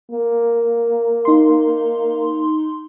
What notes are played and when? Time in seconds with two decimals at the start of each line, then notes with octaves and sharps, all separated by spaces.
0.11 A#3
1.25 D#4 C6